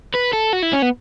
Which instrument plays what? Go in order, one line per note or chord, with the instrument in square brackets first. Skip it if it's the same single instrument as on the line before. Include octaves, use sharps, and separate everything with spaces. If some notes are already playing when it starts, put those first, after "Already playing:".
[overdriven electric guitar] B4
A4
F#4
E4
C#4
B3